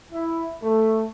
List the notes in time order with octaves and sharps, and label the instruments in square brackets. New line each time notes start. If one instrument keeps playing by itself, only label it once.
[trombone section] E4
A3